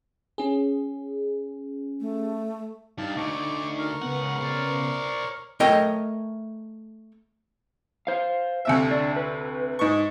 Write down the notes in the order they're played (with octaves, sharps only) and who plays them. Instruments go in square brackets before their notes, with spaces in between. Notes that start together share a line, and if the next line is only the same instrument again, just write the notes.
[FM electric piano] C#4 G#4
[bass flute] A3
[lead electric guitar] G2 [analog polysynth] D#4 [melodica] F5 A5
[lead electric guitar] D2 D3 [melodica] C#6 D6
[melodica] A#4 C#6
[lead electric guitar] C#2 F#5 [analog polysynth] C#3 B3
[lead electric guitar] C5 D5
[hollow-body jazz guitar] A3 A#4 C#5 D#5 G5
[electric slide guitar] C5 F5
[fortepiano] D2 C3 E5
[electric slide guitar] D4
B4
[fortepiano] G#2 C#6